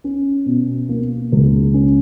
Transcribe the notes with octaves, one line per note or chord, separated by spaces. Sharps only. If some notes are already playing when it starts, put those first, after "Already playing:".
C#4
B2
A#3
C#2
C#4